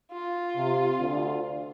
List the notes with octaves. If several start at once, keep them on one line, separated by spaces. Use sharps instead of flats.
F4
C3
D2 D3